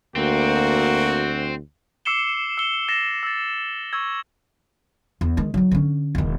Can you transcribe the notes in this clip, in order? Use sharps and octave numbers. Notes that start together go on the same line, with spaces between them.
D2 A#3 C4 F#4
D6 E6 C7 C#7 E7 G7
E6 C#7 G7
A6 A#6 C7 E7
E6 A6
C#6 E6 G#6
E2
D#3 G#3
F#3 D#4
D3 C#4
E1 D#3